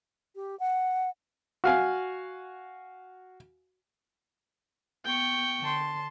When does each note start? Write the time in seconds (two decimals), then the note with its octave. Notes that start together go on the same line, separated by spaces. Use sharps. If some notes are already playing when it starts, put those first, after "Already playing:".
0.35 G4
0.59 F#5
1.64 F#4 F5 G#5
5.05 B3 G5 C#6
5.60 D3 A5 C6